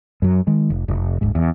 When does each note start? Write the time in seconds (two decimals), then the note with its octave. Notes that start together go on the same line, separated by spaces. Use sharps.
0.22 F#2 F#3
0.47 D#3 G#3
0.70 F1
0.88 F1
1.21 D1 G1 G#2
1.35 E2